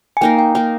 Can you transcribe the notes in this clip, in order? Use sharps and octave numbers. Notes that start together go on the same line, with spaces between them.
G#5
A#3 D#4 A#4 G5
G5
A#3 D#4 A#4 G5